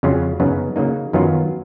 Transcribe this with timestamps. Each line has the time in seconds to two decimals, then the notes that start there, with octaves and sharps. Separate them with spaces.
0.03 F2 C#3 F#3 C#4 F4
0.40 F#2 C#3 F#3 B3 D#4
0.76 C#3 F#3 A#3 D#4
1.13 F#2 D#3 F#3 B3 F4